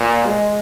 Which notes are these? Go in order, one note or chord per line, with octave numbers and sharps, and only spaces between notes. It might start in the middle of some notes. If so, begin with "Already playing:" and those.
Already playing: A#2
G#3